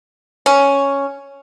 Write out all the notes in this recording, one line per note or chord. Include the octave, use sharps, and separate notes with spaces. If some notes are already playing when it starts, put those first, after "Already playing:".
C#4